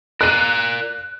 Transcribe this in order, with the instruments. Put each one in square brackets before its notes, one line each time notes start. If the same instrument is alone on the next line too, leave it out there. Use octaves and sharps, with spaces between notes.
[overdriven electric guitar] A#4 D5 [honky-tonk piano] F#6 D#7